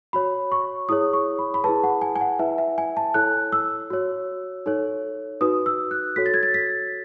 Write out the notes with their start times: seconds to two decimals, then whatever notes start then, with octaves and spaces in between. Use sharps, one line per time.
0.13 F#4 C#5 B5
0.52 C#6
0.89 E4 G#4 C#5 D#6
1.13 C#6
1.39 B5
1.54 B5
1.64 E4 G#4 B4 A5
1.84 F#5
2.02 G#5
2.16 G#5
2.21 F#5
2.39 E4 B4 E5
2.58 E5
2.78 G#5
2.97 A5
3.14 E4 A4 C#5 F#6
3.52 E6
3.90 F#4 C#5
4.66 D#4 A4 C#5
5.41 D#4 F#4 B4 D#6
5.66 E6
5.91 F#6
6.16 F#4 A4 C#5 B6
6.26 A6
6.34 G#6
6.43 A6
6.54 B6